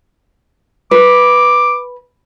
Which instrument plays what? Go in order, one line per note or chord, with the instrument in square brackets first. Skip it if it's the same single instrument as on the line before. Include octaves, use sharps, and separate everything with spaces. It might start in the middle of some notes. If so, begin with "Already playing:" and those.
[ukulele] B4 [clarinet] D6